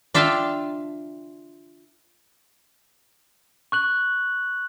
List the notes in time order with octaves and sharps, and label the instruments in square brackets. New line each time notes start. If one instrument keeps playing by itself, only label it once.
[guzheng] D4 F4 E5 F5 G5 A5
[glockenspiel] C#6 F#6 F#7